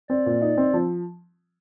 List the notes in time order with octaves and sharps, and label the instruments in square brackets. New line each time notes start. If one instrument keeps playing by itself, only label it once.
[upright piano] C4 [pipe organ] D5
[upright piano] A#2
D#4
C4
F3